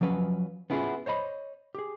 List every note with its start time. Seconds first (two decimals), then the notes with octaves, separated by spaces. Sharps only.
0.01 F3 F#3 C#4 B4
0.70 B3 C#4 E4 F4 G#4
1.06 C5 C#5 D#5 B5
1.75 G4 G#4